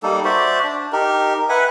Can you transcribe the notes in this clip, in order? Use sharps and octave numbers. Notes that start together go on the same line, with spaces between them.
G3 A#3 D#4 A4
F#4 C5 D5 E5
D4
D#4 G4 A#4
B4 E5 F#5 G#5